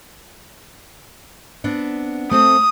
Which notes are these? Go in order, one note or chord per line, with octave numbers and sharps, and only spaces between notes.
B3 C4 D4
A3 C4 A4 D#6